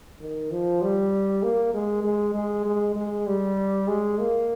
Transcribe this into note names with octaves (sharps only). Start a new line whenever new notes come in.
D#3
F3
G3
A#3
G#3
G#3
G#3
G#3
G#3
G3
G#3
A#3